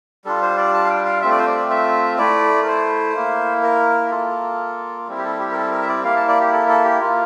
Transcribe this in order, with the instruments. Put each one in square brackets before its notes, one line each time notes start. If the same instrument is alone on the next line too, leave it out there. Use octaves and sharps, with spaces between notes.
[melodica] G3 D4 F4 A4
C5
D5
A5
F5
G5
F5
A3 C4 F4 E5
D5
C5
D5
E5
A3 E4 D5
A#4
C5
A#3 E4
A#4
A#3 F4 A4
G3 C4 E4
G4
A4
G4
A#4
A4
A#4
E5
D5
A#3 E4 F5
A5
D5
G4
A4
A4
G4
A#3 F4